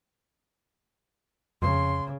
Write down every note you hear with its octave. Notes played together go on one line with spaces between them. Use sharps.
F2 C#3 C6